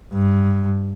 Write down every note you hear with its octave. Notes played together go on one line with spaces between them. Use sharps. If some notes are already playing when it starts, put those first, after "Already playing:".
G2